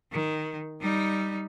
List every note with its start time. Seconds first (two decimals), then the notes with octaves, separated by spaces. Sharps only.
0.12 D#3
0.81 G3 D#4